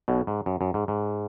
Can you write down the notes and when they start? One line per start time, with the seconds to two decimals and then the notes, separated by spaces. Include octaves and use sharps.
0.08 B1 B2
0.27 G#2
0.46 F#2
0.61 F#2
0.74 G#2
0.88 G#2